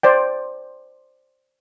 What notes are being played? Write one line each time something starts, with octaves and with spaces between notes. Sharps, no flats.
C5 D5 G5